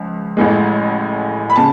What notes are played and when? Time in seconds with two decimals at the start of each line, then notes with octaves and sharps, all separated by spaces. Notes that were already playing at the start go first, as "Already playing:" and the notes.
Already playing: C#2 F3
0.37 A1 A2 G#3
1.50 B5
1.56 C#3 A5